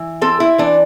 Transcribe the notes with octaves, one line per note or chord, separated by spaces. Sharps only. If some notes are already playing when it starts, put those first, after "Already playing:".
Already playing: E3
C4 A4
E4
E3 D4